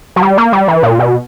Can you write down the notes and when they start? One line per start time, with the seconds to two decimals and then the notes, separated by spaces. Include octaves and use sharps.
0.16 F#3
0.22 G3
0.38 A#3
0.52 G3
0.68 E3
0.83 A#2
0.99 B2